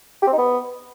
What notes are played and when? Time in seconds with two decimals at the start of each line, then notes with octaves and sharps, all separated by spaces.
0.22 G4
0.27 C4
0.33 D#4
0.38 B3